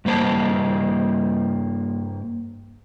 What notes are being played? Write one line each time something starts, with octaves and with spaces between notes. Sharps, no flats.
G2 G3 A#3 C5 A5